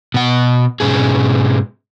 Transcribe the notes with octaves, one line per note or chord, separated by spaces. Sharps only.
B2 F#5
G#2 B2 C#4 G#4